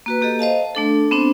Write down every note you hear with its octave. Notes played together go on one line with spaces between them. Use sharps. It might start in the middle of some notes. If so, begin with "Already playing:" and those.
A#3 F#4 B4
A#3 G4 A4 D#5
C5 D#5 F5 A5
A3 D4 A4
B3 C4 D4 C5